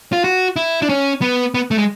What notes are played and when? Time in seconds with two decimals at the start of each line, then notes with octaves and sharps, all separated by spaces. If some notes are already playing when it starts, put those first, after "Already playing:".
0.13 F4
0.24 F#4
0.56 E4
0.82 D4
0.89 C#4
1.22 B3
1.54 B3
1.71 A3
1.78 G#3